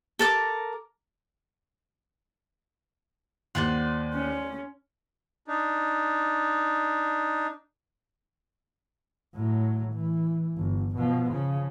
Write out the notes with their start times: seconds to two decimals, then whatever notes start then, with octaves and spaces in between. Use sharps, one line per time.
0.19 A4 A#4 D6
3.55 D#2 C5 D5 F#5 C6
4.13 C#4
5.48 D4 D#4
9.35 A2 F#3
9.93 E3
10.56 G1
10.97 B2 F3
11.32 C#3 F3